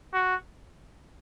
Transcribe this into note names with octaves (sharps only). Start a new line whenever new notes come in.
F#4